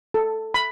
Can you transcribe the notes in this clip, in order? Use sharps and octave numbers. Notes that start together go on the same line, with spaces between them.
A4
B5